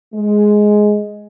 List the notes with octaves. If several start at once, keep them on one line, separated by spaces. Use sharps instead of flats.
G#3